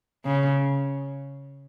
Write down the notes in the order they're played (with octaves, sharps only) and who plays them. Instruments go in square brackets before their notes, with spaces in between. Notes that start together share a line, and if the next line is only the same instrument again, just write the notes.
[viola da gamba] C#3